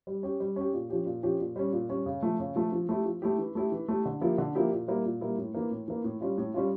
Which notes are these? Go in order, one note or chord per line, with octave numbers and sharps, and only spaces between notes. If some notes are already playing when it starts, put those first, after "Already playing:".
G3
C#4 G4
G3
C#4 G4
A#2
F3 C#4 G4
A#2
F3 C#4 G4
A#2
G3 C#4
A#2
G3 C#4
C#3
F3 A3
C#3
F3 A3
F3
A3 E4 G4
F3
A3 E4 G4
E3
A3 E4 G4
E3
A3 E4 G4
D3
F3 A#3 E4 G4
D3
F3 A#3 E4 G4
A#2
G3 A#3 E4
A#2
G3 A#3 E4
A2
E3 A#3
A2
E3 A#3
A2
G3 C#4 F4
A2
G3 C#4 F4